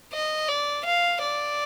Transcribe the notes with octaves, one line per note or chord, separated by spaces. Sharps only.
D#5
D5
F5
D5